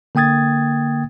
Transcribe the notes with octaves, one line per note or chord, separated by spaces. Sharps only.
D3 A#3 G5 D#6 G#6 A6